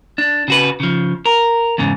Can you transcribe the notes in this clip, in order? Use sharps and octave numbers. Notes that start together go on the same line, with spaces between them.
D4
C#3 F#4 B4
C#3 F3
A#4
E2 G#2 C#3